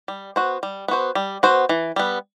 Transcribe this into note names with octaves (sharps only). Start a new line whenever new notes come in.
G3
B3 F#4 C5
G3
B3 F#4 C5
G3
B3 F#4 C5
E3
G3 B3